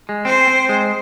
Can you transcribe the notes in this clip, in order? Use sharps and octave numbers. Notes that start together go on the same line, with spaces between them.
G#3
C4 C5
C4
G#3